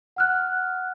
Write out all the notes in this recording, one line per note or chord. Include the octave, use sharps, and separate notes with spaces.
F#5 F6 F#6